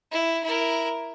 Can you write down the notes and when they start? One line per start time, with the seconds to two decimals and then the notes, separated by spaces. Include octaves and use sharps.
0.12 E4
0.43 E4 A#4